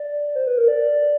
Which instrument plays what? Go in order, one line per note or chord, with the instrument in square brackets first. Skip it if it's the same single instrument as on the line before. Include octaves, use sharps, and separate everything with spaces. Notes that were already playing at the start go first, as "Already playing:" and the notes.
Already playing: [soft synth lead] D5
C5
B4
A#4
D5